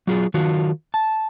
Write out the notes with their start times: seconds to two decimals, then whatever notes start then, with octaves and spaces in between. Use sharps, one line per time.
0.07 F#3 F4 G#4
0.34 D#3 F#3 F4 F#4
0.94 A5